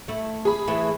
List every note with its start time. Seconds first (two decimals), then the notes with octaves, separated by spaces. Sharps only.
0.08 A3 E4
0.45 G#4 B5
0.67 E3 A3 E4